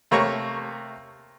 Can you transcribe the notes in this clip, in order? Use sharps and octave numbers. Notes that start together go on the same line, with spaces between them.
C3 A3 A#3 C#5 A#5 C#6